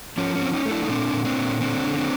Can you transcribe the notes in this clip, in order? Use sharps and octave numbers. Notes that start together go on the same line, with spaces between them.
F3 C#4
C#4
C4
C#4 D#4
A3
D4 E4
D#4
A#2 C4 D4
A#2
C4 D4
A#2
D3 C4 D4
D3
C4 D4